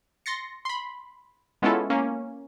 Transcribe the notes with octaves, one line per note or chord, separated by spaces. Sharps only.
C6 A6 A#6 C#7
B5 C6
G#3 B3 C#4 E4 F4 A4
A#3 C#4